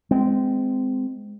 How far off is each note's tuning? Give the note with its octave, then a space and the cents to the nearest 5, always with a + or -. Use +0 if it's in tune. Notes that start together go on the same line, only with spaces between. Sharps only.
G#3 +0 C4 -25